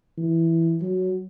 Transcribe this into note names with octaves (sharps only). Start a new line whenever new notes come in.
E3
F#3